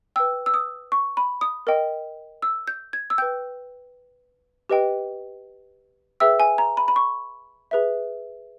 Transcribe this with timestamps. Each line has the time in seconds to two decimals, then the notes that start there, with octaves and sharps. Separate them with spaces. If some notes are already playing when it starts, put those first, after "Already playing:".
0.16 B4 G5 E6
0.46 E6
0.54 D#6
0.92 C#6
1.17 B5
1.41 D#6
1.67 A#4 D#5 G5
2.42 E6
2.67 G6
2.93 G#6
3.10 E6
3.18 B4 G5 G6
4.70 G4 B4 D#5 G5
6.20 G#4 B4 E5 G5 E6
6.40 G#5
6.58 A#5
6.77 B5
6.88 B5
6.96 C#6
7.71 G#4 B4 E5